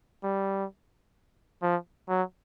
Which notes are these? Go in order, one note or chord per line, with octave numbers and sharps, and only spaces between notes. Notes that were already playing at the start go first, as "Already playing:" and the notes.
G3
F3
F#3